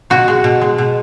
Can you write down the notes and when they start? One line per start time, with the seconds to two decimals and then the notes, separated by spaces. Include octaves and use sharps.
0.10 B2 F#4
0.28 G#3
0.44 B2
0.61 G#3
0.78 B2